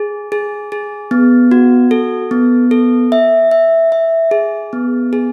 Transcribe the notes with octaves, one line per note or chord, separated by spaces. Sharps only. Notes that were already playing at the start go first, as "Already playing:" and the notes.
Already playing: G#4
G#4
G#4
B3
F#4
A4
B3
A4
E5
E5
E5
G#4
B3
G#4